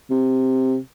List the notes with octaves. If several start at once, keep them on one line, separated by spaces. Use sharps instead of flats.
C3